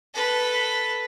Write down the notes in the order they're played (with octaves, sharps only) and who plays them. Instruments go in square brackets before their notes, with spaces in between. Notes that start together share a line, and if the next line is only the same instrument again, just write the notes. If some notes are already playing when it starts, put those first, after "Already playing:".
[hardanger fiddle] A4 B4